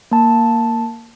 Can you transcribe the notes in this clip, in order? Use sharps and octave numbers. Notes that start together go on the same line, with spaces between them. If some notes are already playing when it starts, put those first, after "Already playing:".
A#3 A5